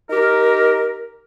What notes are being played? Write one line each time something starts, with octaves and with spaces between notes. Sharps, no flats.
D#4 G4 A#4